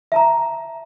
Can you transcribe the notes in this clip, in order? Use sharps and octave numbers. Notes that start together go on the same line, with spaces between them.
E5 A5 A#5